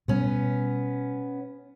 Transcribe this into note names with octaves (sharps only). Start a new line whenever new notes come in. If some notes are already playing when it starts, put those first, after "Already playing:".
B2 G3 B3 C#4